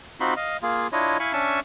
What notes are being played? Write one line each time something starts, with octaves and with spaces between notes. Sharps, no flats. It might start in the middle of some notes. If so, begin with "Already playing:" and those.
C4 D#4 F4 F#4 B5 C6
D#5 F5
A#3 F4 G#4
D4 E4 F4 C#5 D#5
E4 F5 G#5 B5 C#6
C#4 D4 E5 G#5 A5 C#6